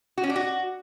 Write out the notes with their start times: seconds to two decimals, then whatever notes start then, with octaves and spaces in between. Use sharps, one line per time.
0.18 F#4
0.24 C#4
0.30 D4
0.36 F#4